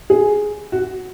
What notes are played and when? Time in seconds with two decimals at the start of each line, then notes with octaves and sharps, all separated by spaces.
0.10 G#4
0.72 F#4